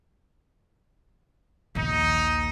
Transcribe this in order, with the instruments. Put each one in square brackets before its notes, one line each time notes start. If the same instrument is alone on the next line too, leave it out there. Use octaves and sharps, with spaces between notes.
[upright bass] A#1 D#2 [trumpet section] D#4